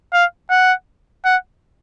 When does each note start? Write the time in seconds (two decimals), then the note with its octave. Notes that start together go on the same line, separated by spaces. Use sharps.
0.13 F5
0.50 F#5
1.25 F#5